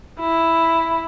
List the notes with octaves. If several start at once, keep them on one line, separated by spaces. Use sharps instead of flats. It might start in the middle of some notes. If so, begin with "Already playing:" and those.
E4